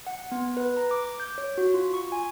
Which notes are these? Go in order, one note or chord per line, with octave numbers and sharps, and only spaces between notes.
F#5
B3
B4
A#5
D6
G6
C#5
F#4
F4
C#6
G#5